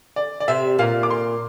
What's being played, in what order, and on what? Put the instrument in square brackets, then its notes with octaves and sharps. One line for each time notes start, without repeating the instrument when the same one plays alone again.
[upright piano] D5
D5
[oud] C3 C4 [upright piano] E5
[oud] A#2 A#3 [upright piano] F5
[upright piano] D6
C6